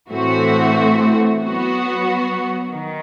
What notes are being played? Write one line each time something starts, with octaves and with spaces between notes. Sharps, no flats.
A2 E3 A3 C4 F#4
F#3 B3 F#4
D#3